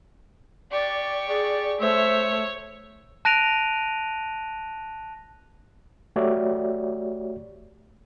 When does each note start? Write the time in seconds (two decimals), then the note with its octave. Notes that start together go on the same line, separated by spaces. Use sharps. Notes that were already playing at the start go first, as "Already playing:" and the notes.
0.72 G4 D5 C#6
1.27 G#4 D5
1.80 A3 C5 C#5 E5
3.25 A5 F#6 A#6 D7 D#7 F7
6.16 A3 F#4 G4 C#5 D5 E5